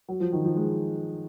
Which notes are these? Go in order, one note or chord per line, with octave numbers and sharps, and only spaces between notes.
F#3
F3
D#3
F3
G#3